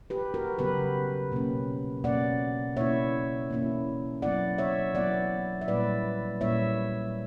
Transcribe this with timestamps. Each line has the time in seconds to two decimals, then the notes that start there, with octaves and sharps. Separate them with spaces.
0.10 G4 B4
0.34 F#4 A#4
0.58 C#3 F#3 B3 G4 B4
1.32 B2 A#3 C#4
2.04 B2 A#3 C#4 D5 F#5
2.76 B2 A#3 C#4 E4 C#5 E5
3.50 B2 A#3 C#4 E4
4.22 F#3 B3 E4 D5 F#5
4.58 C#5 E5
4.95 F#3 B3 E4 D5 F#5
5.61 E5
5.68 A#2 G3 A#3 E4 B4 D5
6.41 A#2 G3 A#3 E4 C#5 E5